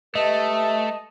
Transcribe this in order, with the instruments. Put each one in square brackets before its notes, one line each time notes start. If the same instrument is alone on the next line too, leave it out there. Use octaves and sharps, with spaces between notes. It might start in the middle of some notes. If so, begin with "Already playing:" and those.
[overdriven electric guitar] A3 [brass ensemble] G4 B4 E5 [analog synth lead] D#5 [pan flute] A5